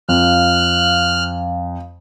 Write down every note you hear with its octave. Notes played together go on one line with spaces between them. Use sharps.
F2 F5 F6 F#6